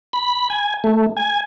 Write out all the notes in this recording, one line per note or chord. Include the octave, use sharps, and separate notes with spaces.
B5
G#5
A3
G#5